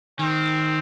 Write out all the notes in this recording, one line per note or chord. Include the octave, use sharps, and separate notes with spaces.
D#3 C4